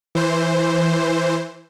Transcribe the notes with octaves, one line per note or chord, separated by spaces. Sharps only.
E3 C5